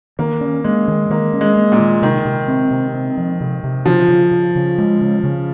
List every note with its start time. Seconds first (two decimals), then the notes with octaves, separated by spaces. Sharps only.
0.19 D#3 A#3
0.41 C#4
0.64 G#3 A#3
0.88 D#3
1.10 D#3 A#3
1.33 C#4
1.41 G#3
1.56 A#3
1.72 A#2
1.80 D#3
2.02 C3 D#3
2.25 C3
2.48 C4
2.71 C3
2.94 C4
3.17 F3
3.41 C3
3.64 C3
3.86 C#3 F3
4.09 C#3
4.32 C#3
4.56 C#3
4.78 G#3
5.01 C#3
5.24 C#3